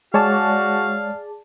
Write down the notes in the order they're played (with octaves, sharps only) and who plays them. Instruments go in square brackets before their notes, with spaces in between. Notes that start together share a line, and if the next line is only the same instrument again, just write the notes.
[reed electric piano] G#3 C#5 [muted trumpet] F#4 [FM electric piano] G#4 D5 A5 [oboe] F5